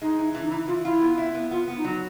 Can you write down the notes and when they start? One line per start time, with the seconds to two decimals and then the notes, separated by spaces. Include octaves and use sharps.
0.02 G#3 D#4
0.18 E3
0.35 E3 D4
0.44 D#4
0.51 E3 E4
0.67 E3 F4
0.85 E4 F4
1.01 B3
1.18 E4
1.35 B3
1.51 B3 F4
1.68 B3
1.77 D#4
1.84 F#3